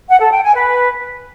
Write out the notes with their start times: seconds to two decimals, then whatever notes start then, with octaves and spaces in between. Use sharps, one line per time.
0.08 F#5
0.19 A4
0.31 G5
0.42 G#5
0.54 B4